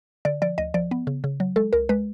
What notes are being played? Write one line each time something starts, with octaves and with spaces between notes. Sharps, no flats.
D3 D5
F3 D5
D2 D#5
F3 D5
B3
C#3
C#3
F#3
G#3 A4
C#2 A#4
G#3 B4